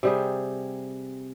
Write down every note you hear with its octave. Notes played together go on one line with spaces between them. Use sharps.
C3 G3 G#4